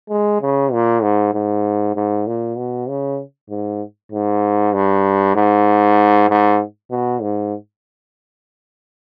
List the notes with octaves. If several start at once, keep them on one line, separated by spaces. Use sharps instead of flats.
G#3
C#3
A#2
G#2
G#2
G#2
A#2
B2
C#3
G#2
G#2
G2
G#2
G#2
B2
G#2